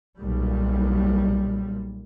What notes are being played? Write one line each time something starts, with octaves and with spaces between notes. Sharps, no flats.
B1 A#2 G3